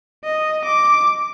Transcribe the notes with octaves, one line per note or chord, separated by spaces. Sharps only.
D#5
D6